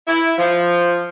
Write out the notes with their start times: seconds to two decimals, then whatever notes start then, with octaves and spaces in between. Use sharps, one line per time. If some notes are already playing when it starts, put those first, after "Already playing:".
0.07 E4
0.38 F3